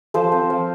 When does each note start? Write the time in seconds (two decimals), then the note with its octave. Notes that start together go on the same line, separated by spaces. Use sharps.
0.14 F3 A4 C5
0.32 C4
0.50 F3